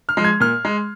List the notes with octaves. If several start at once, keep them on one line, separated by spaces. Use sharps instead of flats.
F6
F3 G#3
G#6
A#2 F6
G#3